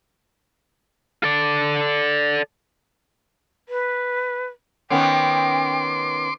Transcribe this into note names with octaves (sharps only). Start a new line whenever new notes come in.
A4 D5
B4
D#3 B3 C#4 G5 C6 D6